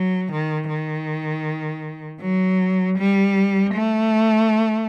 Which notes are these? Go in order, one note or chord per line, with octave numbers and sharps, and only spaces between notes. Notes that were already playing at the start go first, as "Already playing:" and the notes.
Already playing: F#3
D#3
D#3
F#3
G3
A3